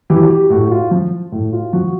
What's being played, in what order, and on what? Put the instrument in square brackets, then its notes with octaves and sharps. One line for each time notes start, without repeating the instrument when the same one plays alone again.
[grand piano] E3 G4
G4
A2 F#4
F4
F3
A2
F4
F3 F#4